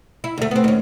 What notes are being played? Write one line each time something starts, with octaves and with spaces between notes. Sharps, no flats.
E4
D2 A3
B3 C4
D#2 C#4